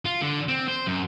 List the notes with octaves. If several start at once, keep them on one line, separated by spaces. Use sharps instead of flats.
F4
D3
C4
C5
F#2